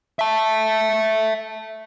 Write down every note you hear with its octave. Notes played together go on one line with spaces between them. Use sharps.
E5 A5